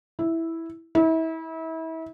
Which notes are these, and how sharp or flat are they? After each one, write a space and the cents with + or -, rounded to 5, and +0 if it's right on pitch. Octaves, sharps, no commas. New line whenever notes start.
E4 -5
E4 -35